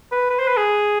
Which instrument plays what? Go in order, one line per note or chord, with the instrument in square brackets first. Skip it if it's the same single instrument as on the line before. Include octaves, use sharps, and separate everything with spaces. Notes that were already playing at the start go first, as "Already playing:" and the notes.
[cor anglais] B4
B4
C5
B4
G#4